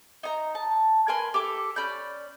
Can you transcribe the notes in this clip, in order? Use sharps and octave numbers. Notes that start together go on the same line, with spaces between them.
D#4 A#5
A5
A#4 B4 G#5 C6
G4 A4 D6
C#4 D5 B5 G6